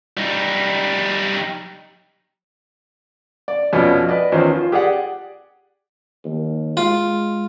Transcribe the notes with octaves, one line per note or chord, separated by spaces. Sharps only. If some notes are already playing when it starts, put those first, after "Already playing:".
G3 D#4
D5
F2 B2 C#4 F4 D5 G#5
F#4 B4 D5 D#5
E2 D#3 F3 C#4 F#4 C5
F4
G4 G#4 D5 F#5
D#2
G#3 F4